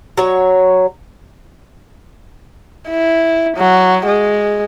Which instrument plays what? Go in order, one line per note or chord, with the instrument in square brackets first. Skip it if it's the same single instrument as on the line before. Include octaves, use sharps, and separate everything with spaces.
[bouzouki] F#3 C#5
[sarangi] E4
F#3
G#3